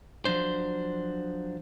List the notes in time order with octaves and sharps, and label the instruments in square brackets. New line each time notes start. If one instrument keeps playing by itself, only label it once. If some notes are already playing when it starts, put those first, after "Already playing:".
[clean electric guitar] F3 F#3 D4 C5